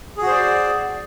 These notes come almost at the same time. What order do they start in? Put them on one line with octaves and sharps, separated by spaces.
G#4 F#4 C5 D5